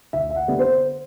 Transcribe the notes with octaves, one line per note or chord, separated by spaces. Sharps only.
D2 E5
E5
F#5
D3 G3 B3
C5